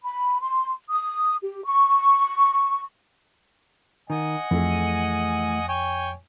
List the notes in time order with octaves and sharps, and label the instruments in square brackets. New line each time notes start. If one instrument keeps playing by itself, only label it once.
[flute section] B5
C6
D#6
G4
C#6
[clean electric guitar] D#3 [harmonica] D#5 F#5 G#5
[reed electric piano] F2 [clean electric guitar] E3 A3 G#4
[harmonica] C#5 G5 G#5